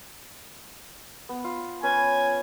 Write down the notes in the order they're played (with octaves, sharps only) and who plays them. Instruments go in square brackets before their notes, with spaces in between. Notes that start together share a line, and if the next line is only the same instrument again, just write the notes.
[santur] B3
F4
[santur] C#4 B4 [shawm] G#5